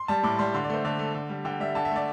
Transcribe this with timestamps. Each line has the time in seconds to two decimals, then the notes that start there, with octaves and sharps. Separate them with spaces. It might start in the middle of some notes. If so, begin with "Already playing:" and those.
Already playing: C6
0.08 G3 A5
0.23 A2 D6
0.39 G3 C6
0.54 D3 C6
0.64 D5
0.70 A3 C5
0.85 D3 D5
0.99 A3
1.14 D3
1.29 G3
1.45 D3 G5
1.60 G3 E5
1.75 D3 A5
1.85 E5
1.91 A3 D5